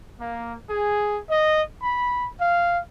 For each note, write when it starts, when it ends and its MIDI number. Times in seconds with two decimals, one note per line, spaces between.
0.20 0.54 58
0.70 1.20 68
1.29 1.62 75
1.82 2.27 83
2.40 2.80 77